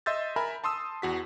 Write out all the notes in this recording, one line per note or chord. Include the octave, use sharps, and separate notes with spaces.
D#5 E5 C6 E6 G6 A6
A#4 E5 G#5 A#5 B5
A5 C6 D#6 E6
E2 F#4 B6